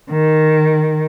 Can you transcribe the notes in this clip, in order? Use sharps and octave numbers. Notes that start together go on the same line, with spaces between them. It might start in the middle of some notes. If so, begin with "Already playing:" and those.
D#3